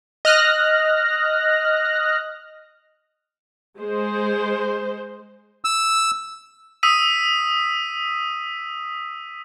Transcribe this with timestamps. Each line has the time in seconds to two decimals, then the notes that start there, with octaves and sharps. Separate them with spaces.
0.25 D#5 F6 F#6 A#6
3.79 G#3 C5
5.65 E6
6.83 D#6 E6 B6 D#7